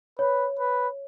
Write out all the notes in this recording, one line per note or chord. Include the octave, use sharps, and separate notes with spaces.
B4 C#5
B4